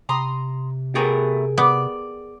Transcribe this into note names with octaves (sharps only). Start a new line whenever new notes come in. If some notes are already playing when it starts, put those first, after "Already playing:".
C3 A#5 C6 D#6
A3 B3 G4 G#4 A#4 A#5
B3 D5